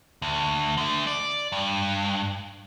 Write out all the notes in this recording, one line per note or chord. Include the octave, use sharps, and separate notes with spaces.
D2
D3 A3
D5
G2